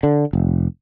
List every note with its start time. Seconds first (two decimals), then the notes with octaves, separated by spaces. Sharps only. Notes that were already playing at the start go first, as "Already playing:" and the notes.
0.03 D3
0.33 F1